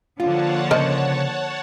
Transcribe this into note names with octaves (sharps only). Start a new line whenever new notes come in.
D3 F3 A#3 F4 C#5 F#5 A5
C#3 A#4 C5 D5 D#5